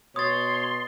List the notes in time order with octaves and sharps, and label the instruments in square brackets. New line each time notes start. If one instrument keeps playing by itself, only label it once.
[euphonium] B2 [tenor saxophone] C#5 [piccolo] C6 [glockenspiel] D#6 A6